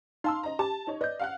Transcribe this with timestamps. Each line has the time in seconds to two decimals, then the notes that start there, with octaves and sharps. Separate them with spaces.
0.24 D#4 F5 A5 C6 E6
0.43 D#5 A#5
0.59 G4 A5
0.87 D#4 C#5
1.01 B4 D5 D#5 G6
1.19 F5 F#5 F#6